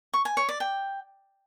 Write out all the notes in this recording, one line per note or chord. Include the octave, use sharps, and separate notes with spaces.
C#6
G#5
C#5
D5
G5